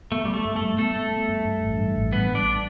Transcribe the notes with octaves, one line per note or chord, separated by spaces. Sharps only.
A3 B3
G3 B3
A3
G2
A3
G3
A3 B3 A4
B3
B3
G2
G2
A1
G2
A1
G3 B3 B4
G3
D4 D5